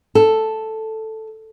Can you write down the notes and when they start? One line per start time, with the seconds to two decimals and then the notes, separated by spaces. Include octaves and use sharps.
0.15 A4